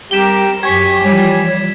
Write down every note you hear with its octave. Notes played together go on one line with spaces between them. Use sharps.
G3 C4 G4 A#4 E7 G7
F#2 G4 C#5 G#5 C#6 G#6 B6
E3 F3 G3 C#5